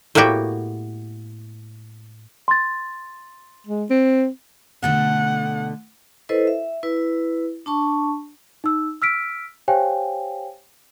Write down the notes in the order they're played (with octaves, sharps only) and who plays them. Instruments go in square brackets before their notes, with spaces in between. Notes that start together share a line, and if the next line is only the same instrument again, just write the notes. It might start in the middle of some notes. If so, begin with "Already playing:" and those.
[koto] A2 A#3 B3 F#4 G4
[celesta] C6 A6
[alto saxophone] G#3
C4
[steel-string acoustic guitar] B2 D3 A3 [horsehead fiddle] F#5
[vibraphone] E4 A4 B4 C5 D#5
E5
E4 B4
D4 A5 C#6
[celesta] D#4 E6
E6 F6 B6 D7
G4 C5 C#5 F5 G5 G#5